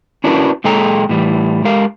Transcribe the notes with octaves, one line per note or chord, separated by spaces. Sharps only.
C#4 D4 E4 F#4 A#4 B4
A#2 G#3 G#4 A4 G5 A#5
A2 E3 G3
G#3 G4 A#4 F5